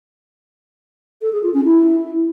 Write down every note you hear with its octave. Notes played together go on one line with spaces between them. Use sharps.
A4
G#4
F4
C#4
E4